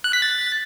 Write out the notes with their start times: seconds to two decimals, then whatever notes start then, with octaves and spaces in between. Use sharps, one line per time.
0.04 F#6
0.13 B6
0.22 A6